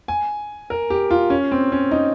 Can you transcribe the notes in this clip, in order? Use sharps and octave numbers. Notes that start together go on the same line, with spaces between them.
G#5
A#4
G4
F4
C#4
C4
C#4
D#4